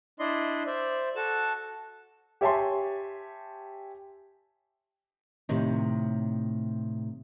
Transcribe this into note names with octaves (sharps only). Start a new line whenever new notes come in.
D4 E4 D5 D#5 C6
C5 D5 E5
F#4 A4 A5
G4 C#5 E5 G#5 A5 C6
A2 C3 D#3